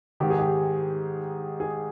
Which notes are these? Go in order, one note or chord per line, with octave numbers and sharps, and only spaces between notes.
G#2 D#3 G4
G#4
G4
G#4